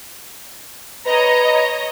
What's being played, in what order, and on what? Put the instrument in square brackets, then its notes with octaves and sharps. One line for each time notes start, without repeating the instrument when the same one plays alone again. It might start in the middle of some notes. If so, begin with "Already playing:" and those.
[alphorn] B4 [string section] C#5 D#5 A#5